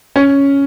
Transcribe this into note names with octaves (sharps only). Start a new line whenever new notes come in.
C#4